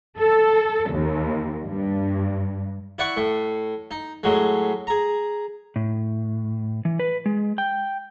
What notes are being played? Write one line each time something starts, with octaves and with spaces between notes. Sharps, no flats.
A4
D#2
G2
E4 D5 F#5 C#6
A2
D#4
A2 F#3 G#3
G#4 A#5
A2
E3
B4
G#3
G5